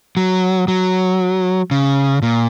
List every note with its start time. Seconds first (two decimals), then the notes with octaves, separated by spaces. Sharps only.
0.17 F#3
0.68 F#3
1.71 C#3
2.22 A#2